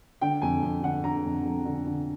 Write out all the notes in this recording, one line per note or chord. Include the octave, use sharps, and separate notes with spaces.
D3 G5
F2 G#5
F2
D3 F#5
D3 A#5
F2
F2
D3
D3